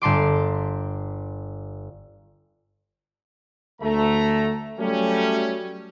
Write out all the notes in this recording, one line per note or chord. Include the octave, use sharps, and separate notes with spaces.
G1 A5 C6 D6
D2 A3 A#5
F#3 G3 A3 C#4